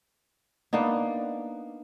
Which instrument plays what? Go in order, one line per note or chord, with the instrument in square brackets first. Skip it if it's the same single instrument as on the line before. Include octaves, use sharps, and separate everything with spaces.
[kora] A#3 B3 D4 D#4